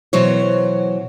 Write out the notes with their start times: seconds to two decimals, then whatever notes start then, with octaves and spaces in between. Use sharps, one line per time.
0.13 B2 E3 F#3 C5 C#5